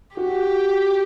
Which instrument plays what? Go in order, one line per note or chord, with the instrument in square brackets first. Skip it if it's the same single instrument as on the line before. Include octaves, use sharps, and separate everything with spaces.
[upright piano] F#4 [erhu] G4